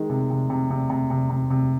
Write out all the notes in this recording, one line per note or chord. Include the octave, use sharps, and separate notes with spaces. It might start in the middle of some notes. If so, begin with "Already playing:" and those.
Already playing: D#3 G#3
C3
C3
C3
C3
C3
C3
C3
C3